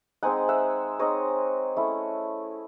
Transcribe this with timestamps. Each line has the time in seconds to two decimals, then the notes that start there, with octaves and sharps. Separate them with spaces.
0.23 G#3 C4 D#4 F#5 G#5
0.49 E5 F#5
0.99 G#3 C4 D#4 C#5 D#5
1.77 A3 C#4 E4